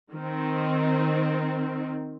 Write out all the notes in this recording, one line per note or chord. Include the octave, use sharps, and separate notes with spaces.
D#3 C4